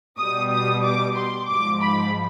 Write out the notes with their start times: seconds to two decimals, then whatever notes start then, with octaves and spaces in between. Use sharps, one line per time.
0.19 B2 G3 D#6
0.52 D#6
0.84 D6
1.17 C6
1.49 G#2 F3 D6
1.82 B5